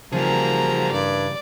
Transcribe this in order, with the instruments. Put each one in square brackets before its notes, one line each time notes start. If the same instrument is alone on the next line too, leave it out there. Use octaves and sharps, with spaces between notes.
[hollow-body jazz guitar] C#3 E3 G3 [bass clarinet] F3 [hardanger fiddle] A#3 A#5 [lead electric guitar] F#4 G#4
[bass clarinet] G2 [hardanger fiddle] D5